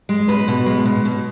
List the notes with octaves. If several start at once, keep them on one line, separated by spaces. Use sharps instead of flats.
G#3
B2 B4
B2
G#3
B2
B2